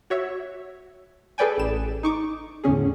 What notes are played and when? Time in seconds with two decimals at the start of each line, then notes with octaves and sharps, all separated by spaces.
0.10 F#4 C#5 E5
1.38 G#4 A4 B4 D5 G5 G#5
1.58 A1 E7
2.03 D#4 C#6 D6
2.64 E2 A2 D3 C#4 G#4